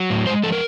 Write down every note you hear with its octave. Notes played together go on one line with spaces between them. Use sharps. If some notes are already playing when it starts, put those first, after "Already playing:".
Already playing: F#3
A2
G#3 C5
F3 A4
A#4